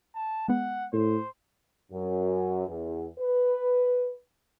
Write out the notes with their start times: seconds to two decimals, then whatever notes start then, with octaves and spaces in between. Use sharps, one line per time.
0.15 A5
0.48 G#3 B3 F#5
0.93 A2 C5
1.92 F#2
2.68 E2
3.19 B4